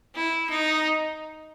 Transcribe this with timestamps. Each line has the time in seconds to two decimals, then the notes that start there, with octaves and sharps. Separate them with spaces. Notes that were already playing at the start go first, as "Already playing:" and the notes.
0.15 E4
0.49 D#4